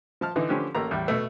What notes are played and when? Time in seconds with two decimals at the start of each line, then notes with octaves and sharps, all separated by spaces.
0.21 F3 A5 F6
0.36 D3 E3 D#4
0.49 D3 F3 C#4 D4 G4 B4
0.75 A1 A3 A#3 A#5
0.91 E2 A2 G3
1.08 B2 A3